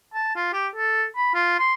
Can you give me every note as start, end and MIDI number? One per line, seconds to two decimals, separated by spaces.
0.14 0.33 81
0.36 0.50 65
0.53 0.67 67
0.75 1.04 69
1.16 1.31 83
1.34 1.58 65
1.59 1.74 84